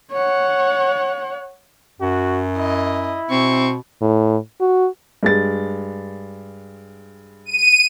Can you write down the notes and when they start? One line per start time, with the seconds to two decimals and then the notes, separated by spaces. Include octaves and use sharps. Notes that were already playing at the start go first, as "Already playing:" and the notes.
0.12 C#5 F#5
2.01 F#2 F#4
2.57 E4 D#5
3.31 B2 C4 C#6
4.01 A2
4.61 F#4
5.23 G2 G#3 A6
7.45 D#7